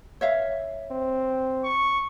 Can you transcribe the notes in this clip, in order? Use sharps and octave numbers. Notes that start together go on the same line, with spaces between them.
C#5 E5 F5
C4
C#6